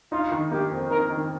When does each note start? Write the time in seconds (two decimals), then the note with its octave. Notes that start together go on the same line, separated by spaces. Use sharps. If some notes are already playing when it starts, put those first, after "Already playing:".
0.12 D#4 F4
0.32 D#3
0.51 A#3 G4
0.71 F2
0.90 D#4 A#4
1.10 D#3